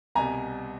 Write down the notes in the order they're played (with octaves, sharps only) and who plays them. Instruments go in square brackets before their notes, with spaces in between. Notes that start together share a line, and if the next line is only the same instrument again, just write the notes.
[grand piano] C2 B2 G3 G#5 A#5